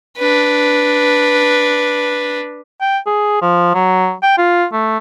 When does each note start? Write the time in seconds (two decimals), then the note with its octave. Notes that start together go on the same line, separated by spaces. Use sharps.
0.18 D4 B4
2.81 G5
3.06 G#4
3.42 F3
3.75 F#3
4.23 G5
4.38 F4
4.73 A3